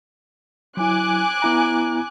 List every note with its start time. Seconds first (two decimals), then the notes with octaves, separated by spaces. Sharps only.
0.77 F#3 E4 G#5 D6 F#6
1.42 B3 E4 A#5